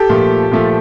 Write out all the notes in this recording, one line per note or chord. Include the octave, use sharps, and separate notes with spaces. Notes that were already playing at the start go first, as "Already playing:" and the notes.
Already playing: G4 A4
A#2 F3 A3
A#2 F3 A3